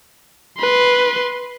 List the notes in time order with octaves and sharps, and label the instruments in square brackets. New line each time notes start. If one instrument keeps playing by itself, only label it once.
[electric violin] B4 C6